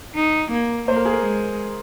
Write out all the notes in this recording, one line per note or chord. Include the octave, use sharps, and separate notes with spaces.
D#4
A#3
A#3 C5
A#4
G#4
A#4
G#3